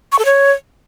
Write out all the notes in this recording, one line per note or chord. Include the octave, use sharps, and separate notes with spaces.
C#6
A4
C#5